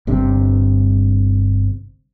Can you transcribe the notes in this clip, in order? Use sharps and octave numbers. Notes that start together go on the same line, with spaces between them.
G1 G2 C3